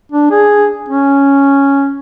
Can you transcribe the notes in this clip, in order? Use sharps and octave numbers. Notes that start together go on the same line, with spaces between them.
D4
G#4
C#4